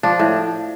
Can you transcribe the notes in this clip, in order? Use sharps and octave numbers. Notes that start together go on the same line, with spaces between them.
F3 D4
A2